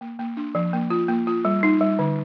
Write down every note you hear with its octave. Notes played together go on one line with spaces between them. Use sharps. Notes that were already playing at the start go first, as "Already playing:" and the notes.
A#3
A#3
D4
F3
A#3
F4
A#3
F4
G3
D#4
G3
D3